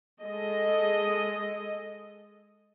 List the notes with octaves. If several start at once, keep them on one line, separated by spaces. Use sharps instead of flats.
G#3 A4 D#5